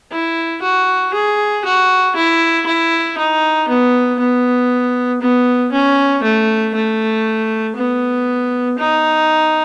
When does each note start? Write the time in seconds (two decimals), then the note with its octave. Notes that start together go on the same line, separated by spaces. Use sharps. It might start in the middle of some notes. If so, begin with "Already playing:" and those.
0.12 E4
0.62 F#4
1.14 G#4
1.65 F#4
2.16 E4
2.66 E4
3.18 D#4
3.69 B3
4.19 B3
5.21 B3
5.72 C#4
6.23 A3
6.74 A3
7.76 B3
8.78 D#4